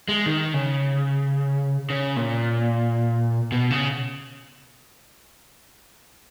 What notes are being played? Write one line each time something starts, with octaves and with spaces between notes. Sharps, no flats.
G#3
D#3
C#3
C#3
A#2
B2
C#3